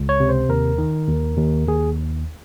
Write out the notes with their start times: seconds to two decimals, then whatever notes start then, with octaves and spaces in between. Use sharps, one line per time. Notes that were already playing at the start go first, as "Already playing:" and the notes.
Already playing: C#2
0.09 C#5
0.20 C3
0.29 C5
0.49 D#2 A#4
0.78 D#3
1.08 D#2
1.38 D#2
1.68 D#2 G#4